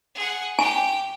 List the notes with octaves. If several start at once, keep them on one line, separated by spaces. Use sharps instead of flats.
G#4 F#5
G4 G5 G#5